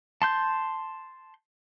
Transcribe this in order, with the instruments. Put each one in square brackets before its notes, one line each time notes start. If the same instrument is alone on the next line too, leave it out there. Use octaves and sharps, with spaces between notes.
[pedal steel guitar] A5 C6 G6